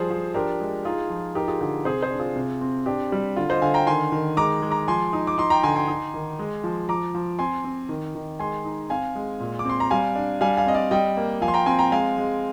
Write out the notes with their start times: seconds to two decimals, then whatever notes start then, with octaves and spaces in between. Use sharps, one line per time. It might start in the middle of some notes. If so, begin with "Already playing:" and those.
Already playing: F3 G3 G#4 C5
0.10 F3
0.34 D4 G4 A#4
0.60 G#3
0.85 D#4 F4 G#4
1.10 F3
1.35 D#4 G4 A#4
1.48 F4 G#4
1.61 D3 G4
1.85 C3 G#4 C5
2.03 G#4 C5
2.11 D4
2.19 F4 G#4
2.36 C3
2.61 C4
2.86 D4 G4
3.12 G3
3.36 D3 F4
3.49 C5 D#5
3.62 D3 F5 G#5
3.74 G5 A#5
3.87 D#3 G#5 C6
4.12 D#3
4.37 G#3 A#5 D6
4.62 G#3
4.71 A#5 D6
4.88 F3 G#5 C6
5.13 D#4
5.27 D6
5.38 D#4 C6
5.50 G5 A#5
5.63 D3 G#5 C6
5.76 G#5 C6
5.88 D#4
6.14 D#3
6.39 G#3
6.64 F3
6.89 F3 A#5 D6
7.15 F3
7.39 C4 G#5 C6
7.64 C4
7.89 D#3
8.15 D#3
8.39 G#3 G#5 C6
8.65 D#4
8.90 C4 F5 G#5
9.15 G#3
9.40 A#2
9.59 D6
9.65 C4 C6
9.80 A#5
9.91 G3 F5 G#5
10.15 D4
10.41 G3 F5 G#5
10.57 F5 G#5
10.66 C4 D#5
10.74 D5 F5
10.91 G3 D#5 G5
11.17 A#3
11.41 F3 F5 G#5
11.48 C6
11.54 G5 A#5
11.66 C4 G#5 C6
11.79 G5 A#5
11.92 G#3 F5 G#5
12.17 G#3